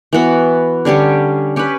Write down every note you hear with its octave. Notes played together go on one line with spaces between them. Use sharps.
E3 B3 F#4
D3 G3 C#4 G4
C#4 G4 B4